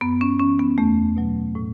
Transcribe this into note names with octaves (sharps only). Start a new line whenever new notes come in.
F#2 B3
C#4
E3 C#4
B3
E2 A3
B2 F#3
A2